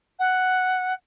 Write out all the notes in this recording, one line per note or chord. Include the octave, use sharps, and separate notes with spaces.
F#5